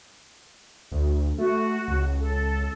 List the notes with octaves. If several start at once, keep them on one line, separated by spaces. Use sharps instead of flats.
D2
A3 F#4
C#2
A4